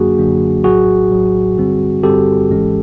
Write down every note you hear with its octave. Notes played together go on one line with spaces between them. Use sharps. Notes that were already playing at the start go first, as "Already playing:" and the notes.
Already playing: F#2 D3 F#3 A#3 D4 F#4 G#4
F#2 D3 F#3 A#3 D4
A#1 A2 F#3 F#4 G#4
A#1 A2 F#3
G2 D3 G3 C4
G2 D3 G3 C4 G4 A4
G#1 G#2 E3 G#3 C#4